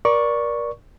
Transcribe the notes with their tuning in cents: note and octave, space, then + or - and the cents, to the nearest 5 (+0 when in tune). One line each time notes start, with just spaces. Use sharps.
A#4 +30 D5 -5 C#6 +0